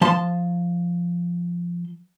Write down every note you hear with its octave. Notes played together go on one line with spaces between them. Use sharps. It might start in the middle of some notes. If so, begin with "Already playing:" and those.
F3 A5 C6